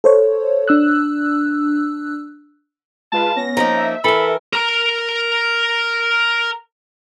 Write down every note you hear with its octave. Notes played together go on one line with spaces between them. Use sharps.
A4 C5 C#5
D4 E6 F#6
G#3 F4 B4 A5
B3 C#4 A#6
F3 A#3 D#4 A#5
E5
E3 A4 A#4 B5
A#4 A#5